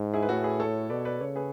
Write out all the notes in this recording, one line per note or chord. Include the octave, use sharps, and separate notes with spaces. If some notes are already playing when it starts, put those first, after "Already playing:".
Already playing: G#2
E4 G#4
B4
A2 F#4 A4
G#4 B4
A4 C#5
B2 B4 D5
B4 D5
C#3 A4 C#5
G#4 B4